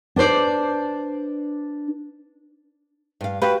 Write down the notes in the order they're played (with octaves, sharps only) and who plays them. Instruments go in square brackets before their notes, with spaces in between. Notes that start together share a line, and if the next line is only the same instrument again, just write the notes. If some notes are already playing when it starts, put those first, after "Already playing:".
[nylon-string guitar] D4 B4 C5 D5
G2 F5
[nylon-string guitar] F#4 G4 F5 [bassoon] B4